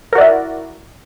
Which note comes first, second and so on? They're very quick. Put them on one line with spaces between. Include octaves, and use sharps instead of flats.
A#4 F#4 D5 E4